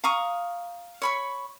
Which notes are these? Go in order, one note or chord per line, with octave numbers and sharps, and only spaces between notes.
F5 A#5 C#6 D#6
C#5 B5 C#6